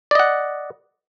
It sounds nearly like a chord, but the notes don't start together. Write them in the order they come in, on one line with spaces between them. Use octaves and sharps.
D5 D#5 F#5